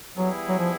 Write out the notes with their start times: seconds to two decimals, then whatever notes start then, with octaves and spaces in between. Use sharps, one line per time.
0.17 E3 F#3 G3 B3 E4 G#4
0.49 F#3
0.58 F3